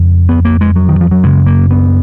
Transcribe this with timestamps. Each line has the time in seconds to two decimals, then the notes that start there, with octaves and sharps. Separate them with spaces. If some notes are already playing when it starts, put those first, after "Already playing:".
Already playing: F2 C#3
0.29 B3
0.45 A#3
0.61 G#3
0.76 F#3
0.89 D#3
1.01 F3
1.11 F#3
1.23 F#2 C#3 G#3
1.46 A#3
1.71 B3